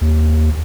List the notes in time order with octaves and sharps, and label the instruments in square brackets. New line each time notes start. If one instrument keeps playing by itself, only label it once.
[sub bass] D#2